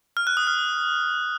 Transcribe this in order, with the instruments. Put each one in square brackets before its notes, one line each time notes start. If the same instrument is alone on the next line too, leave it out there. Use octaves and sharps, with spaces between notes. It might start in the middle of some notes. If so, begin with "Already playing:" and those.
[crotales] F6
F#6
D#6
F6